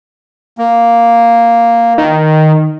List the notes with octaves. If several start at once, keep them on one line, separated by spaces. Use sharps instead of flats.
A#3
D#3